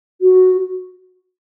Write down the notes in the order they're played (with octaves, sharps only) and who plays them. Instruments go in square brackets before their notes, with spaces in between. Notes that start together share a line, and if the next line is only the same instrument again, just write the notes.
[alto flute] F#4